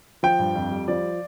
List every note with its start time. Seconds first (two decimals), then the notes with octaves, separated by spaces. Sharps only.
0.23 F3 G5
0.39 G2
0.55 F2
0.71 G3
0.88 F3 D5